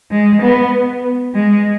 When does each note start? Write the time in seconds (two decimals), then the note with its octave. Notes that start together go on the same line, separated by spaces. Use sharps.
0.11 G#3
0.42 B3
1.35 G#3